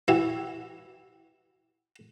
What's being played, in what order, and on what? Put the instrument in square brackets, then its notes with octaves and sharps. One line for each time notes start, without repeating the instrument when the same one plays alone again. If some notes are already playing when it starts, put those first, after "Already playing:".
[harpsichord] E3 E4 F#4 G4